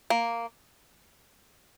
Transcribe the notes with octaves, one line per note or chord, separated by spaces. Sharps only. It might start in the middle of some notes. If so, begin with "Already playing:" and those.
A#3